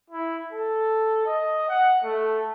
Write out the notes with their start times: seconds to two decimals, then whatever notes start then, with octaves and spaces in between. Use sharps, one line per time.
0.10 E4
0.53 A4
1.26 D#5
1.69 F#5
2.03 A3